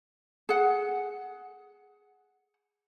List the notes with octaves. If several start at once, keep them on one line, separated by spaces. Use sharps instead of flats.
G#4 F#5